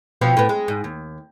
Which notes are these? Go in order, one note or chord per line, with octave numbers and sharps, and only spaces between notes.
B2 F3 C4
A2 B3
G#3
G#2
D#2